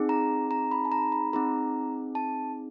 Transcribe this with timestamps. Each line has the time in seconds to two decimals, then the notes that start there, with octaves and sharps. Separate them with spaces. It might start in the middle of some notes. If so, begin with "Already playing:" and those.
Already playing: C4 D#4 G#4
0.09 A#5
0.51 A#5
0.71 B5
0.85 A5
0.92 A#5
1.12 B5
1.33 C4 D#4 G#4 A#5
2.15 A5